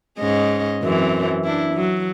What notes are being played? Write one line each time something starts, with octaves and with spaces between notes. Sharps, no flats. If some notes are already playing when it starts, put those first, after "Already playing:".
G#2 C#4 D#5
F#2 E3 C4
D4 E4
F#3